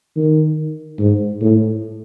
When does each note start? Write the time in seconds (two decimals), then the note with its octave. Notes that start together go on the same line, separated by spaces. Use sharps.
0.16 D#3
0.99 G#2
1.41 A2